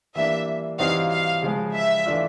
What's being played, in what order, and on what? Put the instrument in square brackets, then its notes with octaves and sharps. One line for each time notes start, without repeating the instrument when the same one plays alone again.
[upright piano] E3 G3 A#3 D4 [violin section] E5
[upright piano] E3 G3 C4 D#4 F#4 [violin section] F5
[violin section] F5
[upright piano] C#3 F3 G#3
[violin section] E5
[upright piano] E3 A3 D4 F4